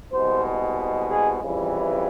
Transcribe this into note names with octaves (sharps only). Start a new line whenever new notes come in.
C2 B2 G#3 C5
G#4
F2 C#3 E3 G3